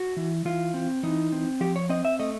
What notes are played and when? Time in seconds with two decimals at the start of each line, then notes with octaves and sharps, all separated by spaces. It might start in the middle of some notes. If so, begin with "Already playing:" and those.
Already playing: F#4
0.17 E3
0.45 E3 F4
0.74 C4
1.03 E3 D#4
1.32 C4
1.60 F3 G4
1.76 C#5
1.89 C4 D#5
2.05 E5
2.19 A3 D#5